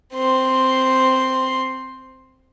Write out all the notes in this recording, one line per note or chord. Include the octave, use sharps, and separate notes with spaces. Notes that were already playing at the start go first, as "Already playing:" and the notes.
C4 C6